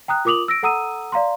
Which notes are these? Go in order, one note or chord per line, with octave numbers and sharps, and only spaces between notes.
G5 A#5 D#6 F#6
F4 A#4 D6 D#6 F7 F#7
E6 A#6 D7
A4 F#5 A#5 D#6 E6 D#7
D5 F5 A#5 C6